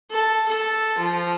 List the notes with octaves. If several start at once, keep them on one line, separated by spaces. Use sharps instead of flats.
A4
A4
F3